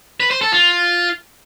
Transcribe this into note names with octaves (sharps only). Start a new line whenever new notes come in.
B4
C5
A4
F4